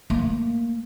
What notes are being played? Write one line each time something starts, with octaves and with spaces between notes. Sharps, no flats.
A3 A#3